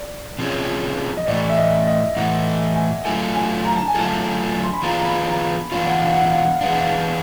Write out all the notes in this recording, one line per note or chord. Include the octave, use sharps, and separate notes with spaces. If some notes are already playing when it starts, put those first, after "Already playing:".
Already playing: D5
C3 F3 G#3 C#4
D#5
A2 E3 A3 D5
E5
D#5
D#5
A2 E3 A3 F#5
G#5
F#3 A3 D4 F4 A4 G#5
G#5
A#5
A5
G#5
F#3 A3 D4 F4 A4 A5
C6
B5
E3 G#3 B3 D4 F4 A#5
A#5
B5
A#5
E3 G#3 B3 D4 F4 F5
F#5
F5
F#5
F5
F#5
F5
E3 G#3 B3 D4 F#5
F5